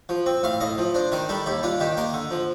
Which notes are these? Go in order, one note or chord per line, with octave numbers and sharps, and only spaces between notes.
F3
C4
A2 F5
A2 D#5
F3
D4 C5
D#3 A#4
G3 A4
D#2 G4
D4 F4
D#3 G4
A#3 A#4
D3
F3